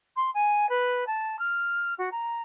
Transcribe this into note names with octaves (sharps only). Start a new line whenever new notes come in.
C6
G#5
B4
A5
F6
F#4
A#5